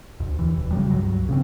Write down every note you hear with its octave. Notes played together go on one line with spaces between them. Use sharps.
D2
D#2 E3
E1
C#3 F#3 G3
C#2 G2 F#3
C#3 B3 C4